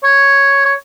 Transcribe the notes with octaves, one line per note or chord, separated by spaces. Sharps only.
C#5
C#5